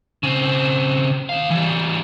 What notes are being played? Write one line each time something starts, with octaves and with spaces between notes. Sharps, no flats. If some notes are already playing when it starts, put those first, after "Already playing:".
C#3 C4
D#2 F5
E3 G3